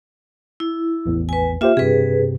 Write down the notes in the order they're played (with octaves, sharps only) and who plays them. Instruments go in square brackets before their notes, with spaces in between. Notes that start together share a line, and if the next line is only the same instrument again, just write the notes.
[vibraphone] E4
[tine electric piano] A1 E2
[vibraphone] B4 G#5
[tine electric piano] A#3 G4 C5 [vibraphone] F4 E5
[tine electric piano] G2 C3 [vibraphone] G#4 B4